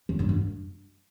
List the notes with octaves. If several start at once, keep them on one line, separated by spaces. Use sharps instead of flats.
F#2
G2
F#2